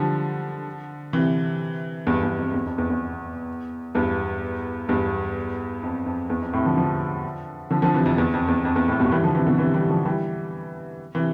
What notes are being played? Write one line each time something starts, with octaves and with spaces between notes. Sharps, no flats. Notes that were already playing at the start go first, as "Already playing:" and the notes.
Already playing: D3 F3 G3
C3 E3
E2 G2
E2
F2
E2
F2
E2
E2
E2 G2
E2 G2
F2
F2
E2
F2
A2 C3
D3 F3
D3 F3
D3 F3
D3 F3
C3 E3
F2
E2
F2
E2
F2
E2
F2 A2
G2 B2
E3 G3
D3 F3
C3 E3
B2 D3
C3 E3
E3 G3
D3 F3
E3 G3
C3 E3